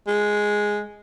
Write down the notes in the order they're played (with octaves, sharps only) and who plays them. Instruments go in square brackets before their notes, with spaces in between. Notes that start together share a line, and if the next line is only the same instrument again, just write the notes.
[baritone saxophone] G#3